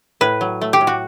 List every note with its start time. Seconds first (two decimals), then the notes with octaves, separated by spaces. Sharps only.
0.21 A2 B4
0.41 F#3
0.61 A3
0.73 G4
0.81 A2
0.87 F#4